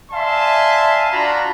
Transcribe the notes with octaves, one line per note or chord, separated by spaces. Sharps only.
D5 E5 F5 G#5 A5 C6
D4 F4 F#4 A#5 B5